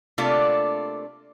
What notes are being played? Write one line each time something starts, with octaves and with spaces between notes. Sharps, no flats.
C3 A3 A#3 D4 F4 A4